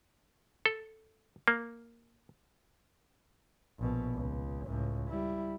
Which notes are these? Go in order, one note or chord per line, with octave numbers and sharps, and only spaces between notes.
A4
A#3
A#1 B2
C#2
C#2 A2
G3 E4